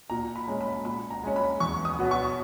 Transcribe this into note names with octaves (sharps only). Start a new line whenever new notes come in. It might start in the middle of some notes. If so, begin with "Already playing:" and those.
A#2 A#5
B5
G#3 C#4
B5
A#2 B5
A#5
G#3 C#4
B5
E2 C#6
D#6
B2 F#3 B3
C#6